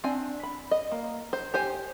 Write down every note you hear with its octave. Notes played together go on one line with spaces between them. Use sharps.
C4 D4 G#5
B5
D#5
A#3
C5
G4 C5 G#5